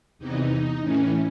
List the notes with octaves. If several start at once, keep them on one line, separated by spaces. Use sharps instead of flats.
E2 C3 E3 D#4
A2 E3 C#4